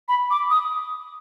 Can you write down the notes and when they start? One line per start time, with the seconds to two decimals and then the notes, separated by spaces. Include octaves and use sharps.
0.08 B5
0.31 D6
0.50 D#6